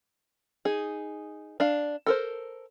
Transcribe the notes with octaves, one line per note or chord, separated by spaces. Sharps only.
D#4 G#4
D4 F5
A4 A#4 C5